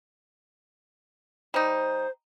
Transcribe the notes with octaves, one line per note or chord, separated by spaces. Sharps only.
G3 D#4 C5